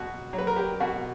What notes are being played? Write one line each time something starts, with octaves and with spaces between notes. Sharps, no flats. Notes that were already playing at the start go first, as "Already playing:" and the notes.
Already playing: B2 F#4
F#3
B4
A#4
G4
B2 F#4